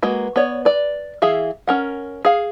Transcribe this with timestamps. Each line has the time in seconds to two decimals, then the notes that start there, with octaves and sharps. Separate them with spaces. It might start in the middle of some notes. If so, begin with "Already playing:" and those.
0.03 G#3 A#3 F#4 B4
0.36 B3 C#5 D5
0.65 B4 D5
1.22 E3 G#4 E5 F5
1.67 C#4 A#4 F#5
2.25 G#4 F5